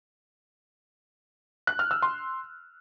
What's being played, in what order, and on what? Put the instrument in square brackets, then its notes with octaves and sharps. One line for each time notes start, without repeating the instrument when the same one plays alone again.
[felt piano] F#6
F6
E6
C6